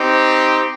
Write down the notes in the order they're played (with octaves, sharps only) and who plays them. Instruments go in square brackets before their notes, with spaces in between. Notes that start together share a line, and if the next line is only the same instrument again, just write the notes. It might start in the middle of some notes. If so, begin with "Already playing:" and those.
Already playing: [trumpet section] C4 D#4 G4